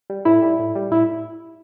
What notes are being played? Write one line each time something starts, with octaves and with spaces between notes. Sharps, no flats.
G3
A2 E4
G3
A2
G3
A2 E4